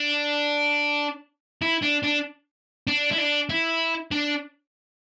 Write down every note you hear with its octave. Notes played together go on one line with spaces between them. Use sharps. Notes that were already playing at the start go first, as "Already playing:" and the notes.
Already playing: D4
E4
D4
D4
D4
E4
D4
E4
D4